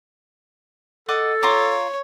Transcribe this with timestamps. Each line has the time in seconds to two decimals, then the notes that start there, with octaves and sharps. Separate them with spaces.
1.09 A4 D#5 F#5 D6
1.43 F4 C#5 A#5 D6